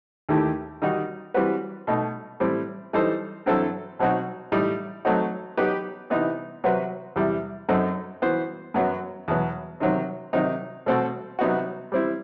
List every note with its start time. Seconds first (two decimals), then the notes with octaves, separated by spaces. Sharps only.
0.29 D#2 D#3 A3 E4 G4
0.82 D#3 G3 D#4 F#4
1.34 E3 G3 C4 F#4 B4
1.87 B2 A3 D#4
2.40 A2 G3 C4 E4
2.93 E3 G3 D#4 A4 C5
3.46 G2 F#3 C4 E4 A4
3.99 B2 F#3 C4 D#4 F#4
4.52 A2 G3 D#4
5.05 F#3 A3 C4 D#4 F#4
5.57 F#3 B3 D#4 G4 B4
6.10 C3 E3 B3 D#4
6.64 C3 F#3 C4 F#4 B4
7.16 E2 C3 E3 G3
7.69 F#2 F#3 C4 D#4 A4
8.22 E3 B3 F#4 C5
8.74 F#2 F#3 B3 F#4
9.28 E2 B2 F#3 B3
9.80 C3 D#3 F#3 C4
10.33 C3 D#3 F#3 C4 D#4
10.86 B2 A3 C4 F#4 A4
11.39 C3 F#3 B3 D#4 F#4
11.92 G3 C4 E4